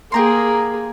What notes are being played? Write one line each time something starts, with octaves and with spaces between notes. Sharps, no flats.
A#3 G4 G#4 A#4 C6